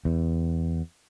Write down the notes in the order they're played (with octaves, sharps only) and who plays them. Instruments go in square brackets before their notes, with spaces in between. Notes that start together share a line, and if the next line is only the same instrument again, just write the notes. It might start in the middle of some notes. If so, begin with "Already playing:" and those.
[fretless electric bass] E2